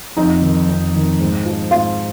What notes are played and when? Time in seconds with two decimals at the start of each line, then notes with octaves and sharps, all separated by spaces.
0.17 F2 D#4
0.42 D#3
0.68 F2
0.95 D#3
1.19 G#2
1.45 F3
1.71 G#2 F4